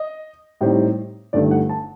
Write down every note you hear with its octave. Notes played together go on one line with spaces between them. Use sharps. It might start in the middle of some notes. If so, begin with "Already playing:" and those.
Already playing: D#5
A2 G3 C4 D#4
G1 G2 D#3 A3 D5
F#5
A5